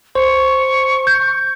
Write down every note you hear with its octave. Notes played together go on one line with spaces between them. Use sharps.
C5 C#6
G6